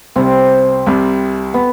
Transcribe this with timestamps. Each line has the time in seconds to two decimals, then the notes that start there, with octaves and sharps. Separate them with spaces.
0.16 C2 C3 G3 C4
0.86 C2 C3 G3
1.54 B3